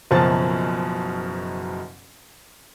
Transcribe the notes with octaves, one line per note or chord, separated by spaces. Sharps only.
F#1 F#2 B2 F3 A5 A6